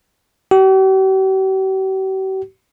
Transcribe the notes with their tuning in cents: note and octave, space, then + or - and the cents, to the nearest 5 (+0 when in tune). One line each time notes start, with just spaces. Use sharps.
G4 -45